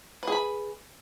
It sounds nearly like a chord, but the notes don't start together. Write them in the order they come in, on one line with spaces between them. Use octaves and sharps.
B4 G#4 B5